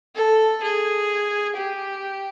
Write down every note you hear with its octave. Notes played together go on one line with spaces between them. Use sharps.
A4
G#4
G4